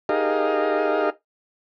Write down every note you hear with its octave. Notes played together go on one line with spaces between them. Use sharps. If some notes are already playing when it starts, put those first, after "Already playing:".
D#4 G4 G#4 A#4 D#5 F5